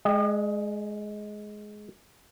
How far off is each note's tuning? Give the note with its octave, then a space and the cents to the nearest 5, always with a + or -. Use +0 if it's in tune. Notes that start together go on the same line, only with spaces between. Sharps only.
G#3 +15 D#5 -40 G5 +20